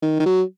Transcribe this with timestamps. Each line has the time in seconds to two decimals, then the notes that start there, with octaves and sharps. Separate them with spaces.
0.02 D#3
0.20 D#3
0.26 F#3